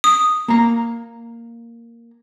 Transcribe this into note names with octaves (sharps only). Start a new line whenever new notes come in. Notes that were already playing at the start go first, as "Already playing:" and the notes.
D#6
A#3 A#5